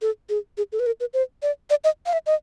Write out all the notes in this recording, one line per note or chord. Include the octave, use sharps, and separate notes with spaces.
A4
G#4
G#4
A4
B4
A#4
B4
C5
D5
D5
D#5
F5
E5
D#5